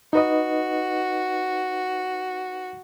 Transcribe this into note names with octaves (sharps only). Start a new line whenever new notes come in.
D#4 F#4 B4 D#5